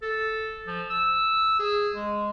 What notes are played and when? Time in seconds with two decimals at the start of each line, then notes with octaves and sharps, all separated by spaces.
0.02 A4
0.67 F3
0.90 E6
1.59 G#4
1.95 G#3